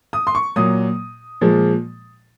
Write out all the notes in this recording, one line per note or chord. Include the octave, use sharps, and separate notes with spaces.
D#6
C6
C#6
A#2 F#3 D#6
A#2 F3 G#3